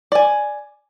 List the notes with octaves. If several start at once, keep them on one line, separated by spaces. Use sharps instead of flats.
D5 G#5